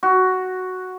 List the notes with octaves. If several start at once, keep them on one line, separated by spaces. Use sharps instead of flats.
F#4